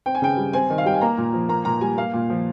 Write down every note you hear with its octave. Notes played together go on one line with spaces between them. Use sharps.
C4 G5
G#5
C#3 G5
G3
C4 G#5
D#3
F5
G3 G5
G#5
A#3 A#5
A#2
F3
A#3 A#5
A#2 A#5
G3 G#5
A#3 F5
A#2
F3